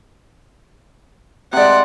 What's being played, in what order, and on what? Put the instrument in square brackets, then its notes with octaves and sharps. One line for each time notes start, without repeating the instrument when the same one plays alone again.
[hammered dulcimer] C3 G#3 [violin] D5 F#5